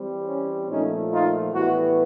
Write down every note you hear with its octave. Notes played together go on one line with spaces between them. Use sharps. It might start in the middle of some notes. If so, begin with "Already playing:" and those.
Already playing: E3 G3 C4
C#4
A#2 F3 A3 C#4 D#4
D#4 F4
A2 E3 G3 B3 E4 F#4